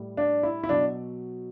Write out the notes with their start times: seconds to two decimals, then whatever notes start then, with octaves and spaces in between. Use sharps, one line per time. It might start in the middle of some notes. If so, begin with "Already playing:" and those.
Already playing: A2 G3
0.17 D4
0.43 E4
0.63 E4
0.69 B2 F#3 D4